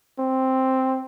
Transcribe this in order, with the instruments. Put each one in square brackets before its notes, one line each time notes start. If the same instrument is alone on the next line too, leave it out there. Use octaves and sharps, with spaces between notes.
[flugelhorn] C4